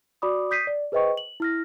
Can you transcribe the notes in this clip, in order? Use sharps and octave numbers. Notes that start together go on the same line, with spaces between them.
F#4 D5 B5 D6 D#6
D#6 G6 B6 C7 D#7
D5
G#4 B4 C5 D#5 G5 C#6
F#7
E4 F6 A#6